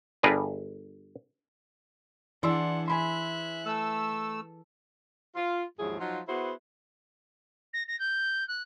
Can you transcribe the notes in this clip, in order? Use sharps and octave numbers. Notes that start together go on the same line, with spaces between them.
G1 G3 D4 G#4 A#4 B4
E3 D4 G#4 D5 F#5 C6 E6
E5 G#5 B5 C6 F#6
A3 A4 E6
F4
D#2 G#2 F3 F#3 E4 G#4
F3 F#3 D#4 F4
B3 E4 F#4 G#4 B4 C5
A#6
A#6
G6
F#6